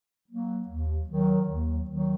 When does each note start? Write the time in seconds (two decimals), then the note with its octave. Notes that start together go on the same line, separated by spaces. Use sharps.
0.27 F#3 A#3
0.68 D#2
1.08 D#3 F#3
1.48 D#2
1.88 D#3 F#3